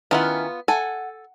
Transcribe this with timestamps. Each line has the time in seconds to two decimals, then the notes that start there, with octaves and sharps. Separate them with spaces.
0.11 D#3 B3 C#4 E4 F4 F#5
0.68 A4 F#5 G#5